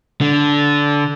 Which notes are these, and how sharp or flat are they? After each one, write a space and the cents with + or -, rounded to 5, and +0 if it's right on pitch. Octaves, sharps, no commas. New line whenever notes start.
D3 -15